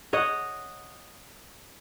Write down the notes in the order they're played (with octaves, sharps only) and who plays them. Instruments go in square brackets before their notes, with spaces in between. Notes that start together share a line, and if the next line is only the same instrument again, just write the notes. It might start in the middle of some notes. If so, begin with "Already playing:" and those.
[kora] C#5 D#5 F#5